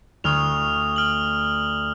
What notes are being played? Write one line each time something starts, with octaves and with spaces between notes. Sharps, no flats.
D2 C#6 D#6 F6 F7
F6 F#7